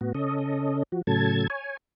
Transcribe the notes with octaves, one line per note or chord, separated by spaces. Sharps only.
A2 B3 F#4
C#3 C#4 A4 D#5
F3 F#4
A2 C#3 F#3 A4 A5 G#6
C#5 G#5